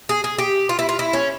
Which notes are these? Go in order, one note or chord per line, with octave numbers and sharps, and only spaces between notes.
G#4
G#4
G4
F4
E4
F4
E4
C#4